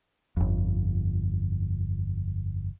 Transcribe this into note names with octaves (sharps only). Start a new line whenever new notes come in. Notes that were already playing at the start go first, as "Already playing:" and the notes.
G1 F2